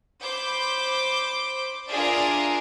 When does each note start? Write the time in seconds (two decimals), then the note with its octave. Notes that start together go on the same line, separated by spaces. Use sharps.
0.23 C5 B5 D6 G6
1.89 D4 F4 G#4 A#4 D5 E5